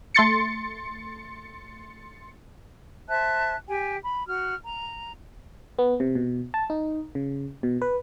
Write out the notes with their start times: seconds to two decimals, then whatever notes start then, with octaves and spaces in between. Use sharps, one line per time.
0.14 A3 C6 A6 C#7
3.09 C5 E5 A5 F#6
3.68 G4 G5 G#5
4.02 B5
4.27 F#4 F6
4.64 A#5
5.79 B3
6.00 C3
6.15 B2
6.54 A5
6.70 D#4
7.15 C#3
7.63 B2
7.82 B4